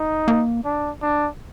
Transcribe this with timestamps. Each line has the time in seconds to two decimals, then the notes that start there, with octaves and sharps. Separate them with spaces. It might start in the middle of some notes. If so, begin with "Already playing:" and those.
Already playing: D#4
0.28 A#3
0.65 D4
1.02 D4